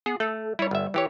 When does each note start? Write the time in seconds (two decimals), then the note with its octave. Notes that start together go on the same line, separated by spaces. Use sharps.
0.06 B3 G#4
0.20 A3 A4
0.59 G3 E4 C#5
0.71 G1 E5
0.94 E3 G4 C#5